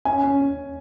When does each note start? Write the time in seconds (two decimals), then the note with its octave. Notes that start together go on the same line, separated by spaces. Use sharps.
0.05 C#4 G#5
0.23 C#4
0.40 C#4